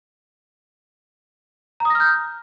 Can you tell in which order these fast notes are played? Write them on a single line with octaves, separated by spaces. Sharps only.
A#5 D#6 A#6 F6 G6